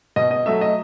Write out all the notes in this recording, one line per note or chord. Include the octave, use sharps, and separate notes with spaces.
B2 D#5
D#5
F#3 A3 E5
D#5